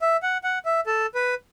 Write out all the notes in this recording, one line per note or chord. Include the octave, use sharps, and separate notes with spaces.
E5
F#5
F#5
E5
A4
B4